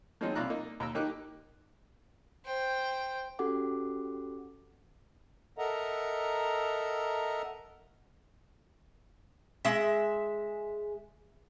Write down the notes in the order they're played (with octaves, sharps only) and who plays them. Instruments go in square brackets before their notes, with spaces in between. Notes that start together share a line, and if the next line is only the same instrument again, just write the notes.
[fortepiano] D#3 F3 F#3 G#3 C4 D#4
C2 F4 D5 E5 A#5 F#6
A#3 D#4
D#2 A#5 E6
D#3 A#3 D#4 G4 D6 F#6
[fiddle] C5 G5
[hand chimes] C#4 F#4 G4 A4 F#5 D6
[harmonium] A4 A#4 D#5 E5 F#5 A#5
[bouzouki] G#3 E5